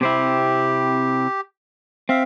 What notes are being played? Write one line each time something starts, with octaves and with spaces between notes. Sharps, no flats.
C3 C4 E4 G4
C4 E5 F5